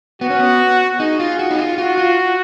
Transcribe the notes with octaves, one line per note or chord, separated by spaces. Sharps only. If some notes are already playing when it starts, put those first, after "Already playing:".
B3 F#4
C#4
B3
D#4 G#4
F4
F#4
D#4
F4
F4 F#4
F4